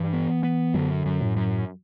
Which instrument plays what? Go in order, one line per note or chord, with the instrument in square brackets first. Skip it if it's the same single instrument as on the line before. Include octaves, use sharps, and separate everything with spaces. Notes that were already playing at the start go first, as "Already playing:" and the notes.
Already playing: [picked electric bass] G2 [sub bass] E3
[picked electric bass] B3
B3
[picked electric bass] F#2 [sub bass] D3
[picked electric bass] F#2
[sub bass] A2
[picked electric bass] F#2